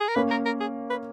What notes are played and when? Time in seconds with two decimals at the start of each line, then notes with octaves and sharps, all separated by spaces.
0.01 G#4
0.08 A#4
0.16 A#3 C#4 B4
0.31 A#4
0.46 A#4
0.61 G#4
0.90 B4